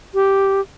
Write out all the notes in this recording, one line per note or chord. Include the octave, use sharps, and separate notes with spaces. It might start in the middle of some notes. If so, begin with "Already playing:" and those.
G4